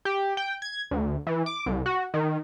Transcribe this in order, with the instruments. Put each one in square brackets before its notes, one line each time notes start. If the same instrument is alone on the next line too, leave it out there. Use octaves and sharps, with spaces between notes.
[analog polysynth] G4
G5
G#6
D2
E3
D6
C2
F#4
D#3